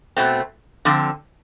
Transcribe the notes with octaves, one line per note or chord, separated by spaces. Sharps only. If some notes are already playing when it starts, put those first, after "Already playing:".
B2 A3 C4
D3 F3 C4